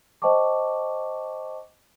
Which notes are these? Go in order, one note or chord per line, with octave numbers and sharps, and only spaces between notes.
C5 D#5 G5 A5 C#6 D6